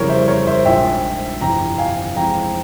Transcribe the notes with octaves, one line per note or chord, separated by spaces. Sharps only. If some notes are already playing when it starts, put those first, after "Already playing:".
Already playing: F2 C#3 E3 G3 A#4 C#5
C5 E5
A#4 C#5
C5 E5
A#1 G#2 F3 E5 G5
G1 F2 C3 E3 G5 A#5
F5 G#5
F2 E3 G#3 C4 G5 A#5